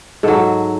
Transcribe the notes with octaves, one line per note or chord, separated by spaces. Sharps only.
G#2 F#3 A4